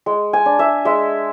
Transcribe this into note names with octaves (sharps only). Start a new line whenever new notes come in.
G#3
G#5
D4
E5
G#3 E5